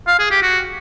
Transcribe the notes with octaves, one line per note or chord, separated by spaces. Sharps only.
F5
G#4
G4
F#4